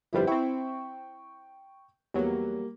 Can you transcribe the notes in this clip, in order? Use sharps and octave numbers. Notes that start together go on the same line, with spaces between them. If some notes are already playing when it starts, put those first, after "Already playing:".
G1 F2 G3 E4 B4 C5
C4 E4 G5 C#6
E2 F#3 G3 A#3